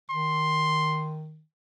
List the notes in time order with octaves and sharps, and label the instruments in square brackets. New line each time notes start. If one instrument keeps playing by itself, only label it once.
[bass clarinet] D#3 [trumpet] C6